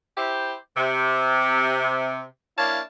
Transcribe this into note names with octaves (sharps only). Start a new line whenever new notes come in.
E4 G4 C5
C3
A#3 D4 E4 C#5 F5 A5